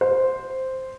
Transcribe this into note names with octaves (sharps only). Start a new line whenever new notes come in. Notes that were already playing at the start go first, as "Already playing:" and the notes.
C5